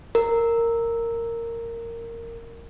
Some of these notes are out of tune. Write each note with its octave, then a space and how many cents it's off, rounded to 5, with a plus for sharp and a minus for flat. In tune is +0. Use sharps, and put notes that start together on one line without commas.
A#4 -10